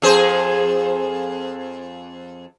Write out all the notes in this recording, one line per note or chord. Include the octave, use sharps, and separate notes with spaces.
F2 G#4 C5